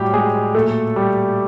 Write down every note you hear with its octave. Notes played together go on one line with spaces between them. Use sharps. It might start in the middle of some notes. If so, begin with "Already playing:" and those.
Already playing: A2 F#3 G3 G4
G#3 G#4
A#2 F#3 A3 A4
G3 G4